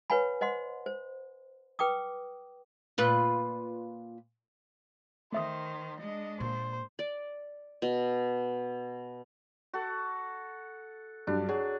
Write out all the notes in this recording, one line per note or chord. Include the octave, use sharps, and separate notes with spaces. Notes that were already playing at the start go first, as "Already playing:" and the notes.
B4 C#5 F#5 G#5 B5
C5 D#5 F#5 C6
C5
B4 G5 D6 D#6
A#2 F4 B4
D#3 A3 C5 E5 D#6
G#3 D4 D#5
A#2 C5 C#6
D5
B2
F#4 A4
G2 F#3 D4
F#3 G#4